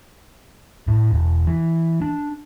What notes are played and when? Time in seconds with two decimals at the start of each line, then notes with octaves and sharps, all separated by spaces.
0.87 A2
1.11 E1
1.47 E3
2.02 D4